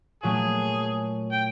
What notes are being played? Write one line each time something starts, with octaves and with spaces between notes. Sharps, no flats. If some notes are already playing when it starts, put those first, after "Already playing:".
A#2 F#3 A3 G#4
G5